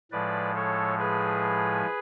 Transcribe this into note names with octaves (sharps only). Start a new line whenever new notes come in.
A2 F3 G#3 B4 D5
A4 C#5
G#4 B4